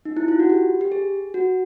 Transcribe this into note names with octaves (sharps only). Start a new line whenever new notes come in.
D#4
E4
F4
F#4
G4
G4
G#4
F#4